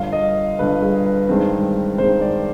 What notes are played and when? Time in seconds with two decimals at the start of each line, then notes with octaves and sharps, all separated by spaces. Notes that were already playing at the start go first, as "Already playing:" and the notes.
Already playing: G1 G2 D3 F5
0.13 D#5
0.59 G1 G2 D3 B4
0.82 G#4
1.06 B4
1.29 G2 D#3 G#3 C4
1.98 G2 D#3 G#3 C4 C5
2.21 D5